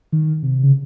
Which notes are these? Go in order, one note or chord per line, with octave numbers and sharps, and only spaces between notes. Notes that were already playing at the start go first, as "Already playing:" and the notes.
D#3
C3
C#3